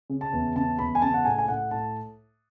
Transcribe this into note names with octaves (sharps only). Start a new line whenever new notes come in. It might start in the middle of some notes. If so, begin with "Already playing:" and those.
C#3
A5
E2
C#3 A5
E2 B5
G#5
C#3 A5
F#5
A2 G#5
G#5
A2 F#5
A2 A5